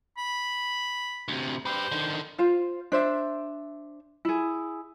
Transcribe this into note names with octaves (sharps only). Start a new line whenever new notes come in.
B5
D2 C3
G4 B4 C5
D3 D#3
F4 C5 F5
D4 C5 E5
E4 G#4